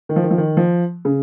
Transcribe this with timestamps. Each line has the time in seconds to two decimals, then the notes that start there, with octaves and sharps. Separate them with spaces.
0.09 D#3
0.16 F3
0.24 D#3
0.31 F3
0.38 D#3
0.57 F3
1.05 C#3